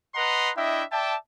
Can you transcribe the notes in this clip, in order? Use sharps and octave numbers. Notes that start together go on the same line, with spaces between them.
B4 D#5 F#5 A#5 C6
D4 E4 D#5 E5 G5
D5 E5 G5 A5